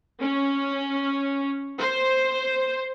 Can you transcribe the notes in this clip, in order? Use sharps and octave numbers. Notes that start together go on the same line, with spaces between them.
C#4
C5